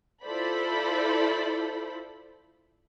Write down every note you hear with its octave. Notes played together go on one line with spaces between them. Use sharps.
E4 F4 A4 C5 D5 B5